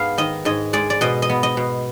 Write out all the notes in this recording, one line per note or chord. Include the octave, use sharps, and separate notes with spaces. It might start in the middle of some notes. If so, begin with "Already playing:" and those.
Already playing: G#2 G#3 B3 F5
D#3 D#5
G#2 D#5
G#3 D5
D5
B2 D#5
D#5
B3
D#5
B2